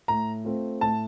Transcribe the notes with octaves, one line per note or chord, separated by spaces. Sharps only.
A2 A#5
A3 C4 F4
A2 A5